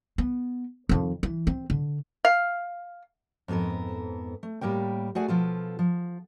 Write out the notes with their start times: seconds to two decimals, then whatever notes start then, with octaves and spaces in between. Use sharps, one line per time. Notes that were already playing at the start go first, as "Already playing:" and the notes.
0.18 B3
0.89 F2 D#3
1.23 E3
1.47 C4
1.70 D3
2.25 F5
3.48 F2 G#2 B3 A4 A#4
4.43 A3
4.61 A2 G3 A#3 A#4 G5
5.15 A3 F#4 G#4 D5 F#5 G#5
5.28 B2 F3 F4 A4
5.79 F3